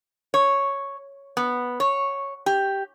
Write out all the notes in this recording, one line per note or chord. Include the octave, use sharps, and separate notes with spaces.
C#5
B3
C#5
G4